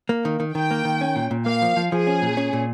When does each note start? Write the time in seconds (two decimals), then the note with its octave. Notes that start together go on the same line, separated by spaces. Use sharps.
0.09 A#3
0.25 D#3
0.40 D#3
0.55 D#3 G5
0.71 A#3
0.85 D#3
1.01 C#4
1.16 A#2
1.31 A#2
1.46 A#3 F5
1.62 F3
1.77 F3
1.91 F3 G#4
2.07 C#4
2.22 A#2
2.37 C#4
2.53 A#2